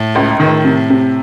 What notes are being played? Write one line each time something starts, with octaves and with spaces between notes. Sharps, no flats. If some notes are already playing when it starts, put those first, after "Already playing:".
Already playing: A2
C#2
A2 D#3
C3
C3